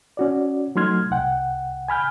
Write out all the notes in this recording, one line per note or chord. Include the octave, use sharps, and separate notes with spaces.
C#4 F#4 D5
F#3 A3 D#4 C6 F6 G#6
C2 F#5 G5
G#5 B5 F6 G6